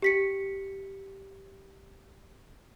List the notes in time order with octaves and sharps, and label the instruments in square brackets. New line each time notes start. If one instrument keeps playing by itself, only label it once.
[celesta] G4 B6 C#7